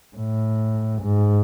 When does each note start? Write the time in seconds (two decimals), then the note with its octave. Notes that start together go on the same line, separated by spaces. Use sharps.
0.17 A2
1.03 G#2